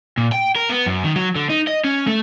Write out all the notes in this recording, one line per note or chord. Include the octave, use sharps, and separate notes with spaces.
A#2
G5
A#4
B3
F#2
D#3
F#3
D3
D#4
D#5
C#4
A3